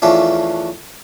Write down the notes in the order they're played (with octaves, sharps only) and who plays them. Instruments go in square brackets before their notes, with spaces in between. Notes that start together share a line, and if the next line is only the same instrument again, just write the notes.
[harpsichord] E2 F3 A3 C#4 D4